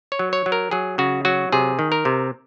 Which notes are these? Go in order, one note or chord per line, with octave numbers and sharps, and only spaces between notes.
C#5
F#3
C#5
F#3
A#4
F#3 G#4
C#3 F#4
F#3 F#4
C3 G#4
D#3
A#4
C3